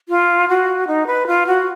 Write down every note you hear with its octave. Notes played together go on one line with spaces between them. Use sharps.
F4
F#4
D#4
B4
F4
F#4